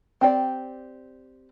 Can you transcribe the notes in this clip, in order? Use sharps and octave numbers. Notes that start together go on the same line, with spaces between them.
C4 G4 D5